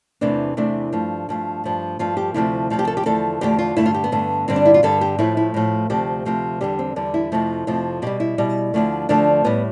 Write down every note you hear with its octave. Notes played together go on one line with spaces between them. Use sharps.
E2 C3 E3 A3 D4
E2 C3 E3 A3 D4
G2 F3 A3
G2 F3 A3
G2 F3 A3
G2 F3 A3 F4
G4
D2 C3 F3 A3 E4
D2 C3 F3 A3
G4
A4
G4
E2 D3 F3 A3 A4
E2 D3 F3 A3 G4
F4
G2 D3 A3 E4
F4
G4
B3
G2 D3 A3
G2 D3 G3 C4
D4
E4
F4
G2 D3 G3 A4
G4
A2 F3 A3 E4
E4
A2 F3 A3
D2 C3 F3 A3 G4
D2 C3 F3 A3
E2 D3 G3 G4
C4
E2 D3 G3 D4
E4
F2 C3 F3 A3
F2 C3 F3 A3
B2 G3 G4
E4
B2 G3
D2 D3 F3 A3
D2 D3 F3 A3 D4
A2 G3 B3